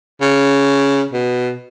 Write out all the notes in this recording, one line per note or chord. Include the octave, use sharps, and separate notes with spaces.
C#3
B2